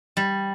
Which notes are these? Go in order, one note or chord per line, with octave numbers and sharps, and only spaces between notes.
G3